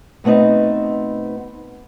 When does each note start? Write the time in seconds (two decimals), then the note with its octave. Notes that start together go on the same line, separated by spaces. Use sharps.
0.24 B2 A3 B3 C4 D#4